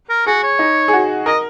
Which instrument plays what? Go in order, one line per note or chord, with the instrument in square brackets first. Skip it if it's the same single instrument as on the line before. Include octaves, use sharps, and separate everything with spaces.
[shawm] A#4
[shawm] F#4 [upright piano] G#4
[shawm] C#5
[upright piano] D#4
G#4
F#4
[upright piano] A#4 [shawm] D#5